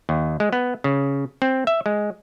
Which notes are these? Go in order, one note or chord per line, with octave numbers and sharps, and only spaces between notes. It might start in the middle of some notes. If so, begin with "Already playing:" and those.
D#2
G#3
B3
C#3
C4
E5
G#3